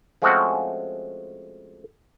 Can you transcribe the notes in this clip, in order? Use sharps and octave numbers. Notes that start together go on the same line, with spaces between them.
F3 G#3 A3 C4 C#4 F#4